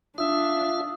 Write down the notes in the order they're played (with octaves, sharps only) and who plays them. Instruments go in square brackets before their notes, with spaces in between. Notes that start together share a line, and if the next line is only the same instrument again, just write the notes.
[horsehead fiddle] D4 [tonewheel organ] F4 F5 [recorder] E5 [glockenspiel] D#6 E6